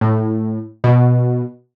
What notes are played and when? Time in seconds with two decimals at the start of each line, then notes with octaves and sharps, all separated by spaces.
0.01 A2
0.84 B2